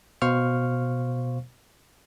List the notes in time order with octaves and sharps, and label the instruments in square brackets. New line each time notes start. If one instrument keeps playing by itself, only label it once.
[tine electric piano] B2 C5 F5 C#6 F6